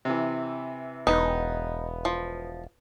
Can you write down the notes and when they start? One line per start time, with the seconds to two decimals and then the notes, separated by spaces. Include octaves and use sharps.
0.05 C3 E3
1.07 E1 B3 D#4
2.05 F3